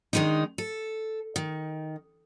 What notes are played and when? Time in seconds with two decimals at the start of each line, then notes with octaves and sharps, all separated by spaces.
0.13 D#3 F3 G#3 D4 D#4
0.58 A4
1.36 D#3